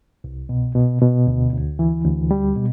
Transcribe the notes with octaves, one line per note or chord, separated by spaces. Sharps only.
C2
B2
B2
B2
D2
D2
E3
D2
G3
B2